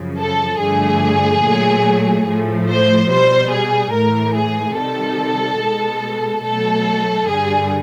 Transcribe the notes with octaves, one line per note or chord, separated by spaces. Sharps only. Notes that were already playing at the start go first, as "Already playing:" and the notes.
Already playing: F#2 C#3 F3
A4
G2 D3 F3 A3 G#4
A#2 F#3 A3
A2 F3 A3
C5
B2 G3 C5
G#4
A2 E3 A3 A#4
G#4
C3 D#3 G3 A4
B2 G#3
B2 F#3 A3 A4
G2 D3 G3 G#4